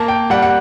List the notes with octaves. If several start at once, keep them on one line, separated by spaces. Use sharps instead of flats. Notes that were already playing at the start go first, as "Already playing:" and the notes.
Already playing: A#3 A5
G5
G3 F#5
F#5